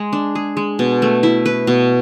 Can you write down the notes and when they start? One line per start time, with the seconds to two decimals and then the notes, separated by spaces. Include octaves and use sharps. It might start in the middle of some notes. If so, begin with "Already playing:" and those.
Already playing: G#3 G#4
0.13 D4
0.35 G#4
0.57 G#3
0.79 B2
1.02 A3
1.23 E4
1.46 B4
1.67 B2